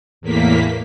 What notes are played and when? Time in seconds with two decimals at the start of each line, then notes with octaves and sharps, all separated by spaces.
0.21 E2 A2 A#3 B6